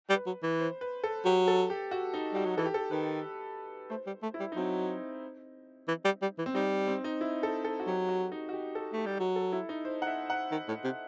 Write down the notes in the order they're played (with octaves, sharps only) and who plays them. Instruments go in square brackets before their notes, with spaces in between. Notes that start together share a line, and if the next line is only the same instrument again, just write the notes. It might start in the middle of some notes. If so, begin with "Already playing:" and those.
[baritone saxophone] G3
[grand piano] B4
[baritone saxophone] F#3
E3
[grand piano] C5
B4
A4
[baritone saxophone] F#3 [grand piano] G4
[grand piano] A4
G4
F#4
D#4
[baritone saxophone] G3 [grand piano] F#4
[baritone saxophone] F#3
[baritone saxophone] E3 [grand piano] A4
[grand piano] G4
A4
[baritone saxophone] D#3 [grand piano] B4
[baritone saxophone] A3 [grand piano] C5
[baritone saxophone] G3
A3
[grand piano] E4
[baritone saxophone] G3
[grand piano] D#4
[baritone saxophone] F#3 [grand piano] C4
[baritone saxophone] E3
G3
G3
E3
[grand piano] C4
[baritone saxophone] G3 [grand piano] D#4
[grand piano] C4
D#4
E4
A4
A4
F#4
[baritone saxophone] F#3 [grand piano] G4
[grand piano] F#4
D#4
F#4
G4
A4
[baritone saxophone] A3 [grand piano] G4
[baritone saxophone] G3
F#3
[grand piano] A4
E4
D#4
C5
F#5
E5
F#5
[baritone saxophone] D#3
A2
C3